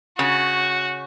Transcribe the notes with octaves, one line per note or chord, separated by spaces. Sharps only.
C#3 F#4